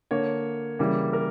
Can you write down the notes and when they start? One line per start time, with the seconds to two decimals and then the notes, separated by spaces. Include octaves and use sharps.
0.11 D3 A#3 C#5
0.79 C#3 E3 G3 A#3
1.13 A#4